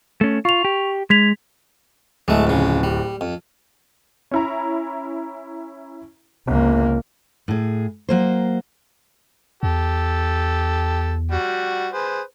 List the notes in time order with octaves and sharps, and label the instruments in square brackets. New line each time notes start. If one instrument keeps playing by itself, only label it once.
[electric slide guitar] A3 C#4
[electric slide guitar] F4 [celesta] C#6 F7
[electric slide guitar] G4
[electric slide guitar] G#3 [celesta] G#6 B6 F7
[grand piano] D1 [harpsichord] G#3 A3
[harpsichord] F2 C#3
G3
F2
[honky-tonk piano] C#4 E4 A#5
[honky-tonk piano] G1 [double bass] C#2 A#3
[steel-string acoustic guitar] A2 G#4
F#3 A#3 C5
[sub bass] E2 [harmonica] G4 A4
[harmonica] G3 F#4
G#4 B4 C5